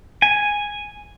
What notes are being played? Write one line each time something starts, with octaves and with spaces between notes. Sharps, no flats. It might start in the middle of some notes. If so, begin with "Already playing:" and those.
G#5